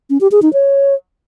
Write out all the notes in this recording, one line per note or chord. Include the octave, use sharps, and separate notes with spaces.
C#4
G4
G#4
D#4
C#5